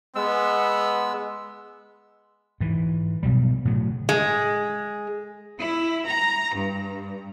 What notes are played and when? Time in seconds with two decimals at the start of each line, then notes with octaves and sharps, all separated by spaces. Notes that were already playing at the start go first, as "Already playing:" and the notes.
0.15 G#3 B3 E6
2.60 G#2 E3
3.23 B2 F#3 G3
3.65 A2 C#3 F#3
4.09 G#3
5.59 E4
6.07 A#5
6.55 G2